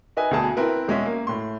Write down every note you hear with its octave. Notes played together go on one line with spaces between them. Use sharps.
D#4 B4 D#5 E5 G#5
D2 B2 G#4 A5
C4 E4 A#4 B4
E1 G#3 C#4 E5
A#3
A2 C6